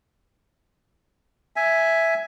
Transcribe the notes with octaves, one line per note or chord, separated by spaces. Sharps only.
E5 G#5